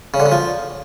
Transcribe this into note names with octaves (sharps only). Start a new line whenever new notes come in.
C#3
D3
C#3
F3